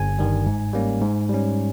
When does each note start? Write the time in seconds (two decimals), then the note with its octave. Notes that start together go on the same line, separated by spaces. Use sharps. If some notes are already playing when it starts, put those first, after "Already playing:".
Already playing: G1 G#5
0.19 G2 D#3 G3
0.46 G#2
0.73 G3 A#3 C#4
1.02 G#2
1.29 G3 C#4